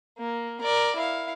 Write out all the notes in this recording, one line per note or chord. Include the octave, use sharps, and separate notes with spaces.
A#3
A#4 D5
E4 F5